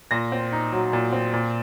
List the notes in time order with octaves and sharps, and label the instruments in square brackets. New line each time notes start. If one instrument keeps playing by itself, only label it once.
[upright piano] A#2 A#6
C4
D#4
F#3
A#2
C4
A#2